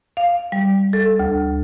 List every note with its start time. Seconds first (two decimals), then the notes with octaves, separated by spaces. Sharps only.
0.17 F5
0.52 G3
0.93 A4
1.19 D2